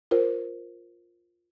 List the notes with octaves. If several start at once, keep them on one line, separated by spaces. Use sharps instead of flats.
F4 A#4 C5